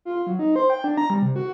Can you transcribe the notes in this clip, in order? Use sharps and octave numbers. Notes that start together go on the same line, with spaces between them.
F4
F#3
D#4
C5
G5
D4
A#5
G3
C3
F#4